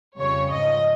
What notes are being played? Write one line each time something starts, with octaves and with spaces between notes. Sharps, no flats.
F2 C#3 G3 C#5
G#2 F3 D#5